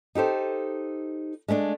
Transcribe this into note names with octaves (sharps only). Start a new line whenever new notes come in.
D#4 G4 A4 C5
G#3 A3 C#4 D4